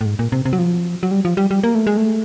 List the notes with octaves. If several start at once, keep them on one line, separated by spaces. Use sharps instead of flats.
A2
G#2
A#2
C3
C3
F#3
F3
F#3
G3
F3
G3
G3
A#3
A3
G#3
A3